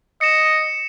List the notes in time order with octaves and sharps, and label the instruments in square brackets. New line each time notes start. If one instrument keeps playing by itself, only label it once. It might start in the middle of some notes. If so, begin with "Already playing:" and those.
[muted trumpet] D#5 [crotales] C#7 E7